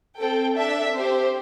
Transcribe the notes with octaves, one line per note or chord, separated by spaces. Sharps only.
C4 A4 G5
D4 A4 E5
C4 G4 C5